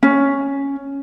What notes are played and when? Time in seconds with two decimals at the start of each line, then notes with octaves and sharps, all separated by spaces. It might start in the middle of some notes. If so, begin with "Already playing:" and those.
0.03 C#4